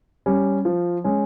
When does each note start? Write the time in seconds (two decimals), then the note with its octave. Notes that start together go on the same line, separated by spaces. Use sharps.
0.26 G3 C#4
0.65 F3
1.04 G#3 C#4